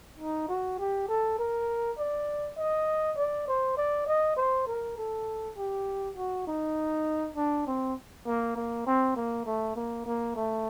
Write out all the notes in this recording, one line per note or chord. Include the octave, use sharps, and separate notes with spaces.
D#4
F#4
G4
A4
A#4
D5
D#5
D5
C5
D5
D#5
C5
A#4
A4
G4
F#4
D#4
D4
C4
A#3
A#3
C4
A#3
A3
A#3
A#3
A3